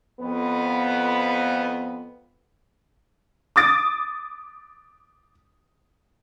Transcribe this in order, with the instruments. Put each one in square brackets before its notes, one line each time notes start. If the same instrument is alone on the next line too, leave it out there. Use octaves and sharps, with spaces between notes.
[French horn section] F2 B3
[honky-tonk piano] D6 D#6 A6 D7